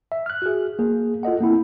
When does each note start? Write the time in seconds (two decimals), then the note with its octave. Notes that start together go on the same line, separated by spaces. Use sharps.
0.12 E5
0.26 F6 F#6
0.42 F#4 G#4
0.79 A#3 G#4
1.23 F4 A4 D#5 F#5
1.41 A#3 C4 E4